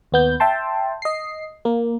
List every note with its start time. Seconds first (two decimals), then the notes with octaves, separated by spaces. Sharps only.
0.12 D#2 B3 G6
0.40 E5 G5 A5 C6
1.02 D#5 C7
1.65 A#3